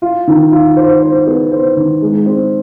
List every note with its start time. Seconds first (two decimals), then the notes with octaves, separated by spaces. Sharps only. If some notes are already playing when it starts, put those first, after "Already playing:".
0.02 F4
0.27 D#3
0.52 F4
0.77 C5
1.02 C5
1.27 B3
1.52 C5
1.77 D#3
2.02 G#3
2.26 C4